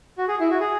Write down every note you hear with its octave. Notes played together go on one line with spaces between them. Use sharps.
F#4
G#4
E4
F#4
G#4